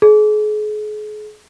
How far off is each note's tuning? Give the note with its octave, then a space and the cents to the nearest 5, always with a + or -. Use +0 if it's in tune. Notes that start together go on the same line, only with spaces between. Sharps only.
G#4 +35